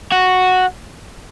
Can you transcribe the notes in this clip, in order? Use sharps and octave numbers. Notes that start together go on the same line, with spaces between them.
F#4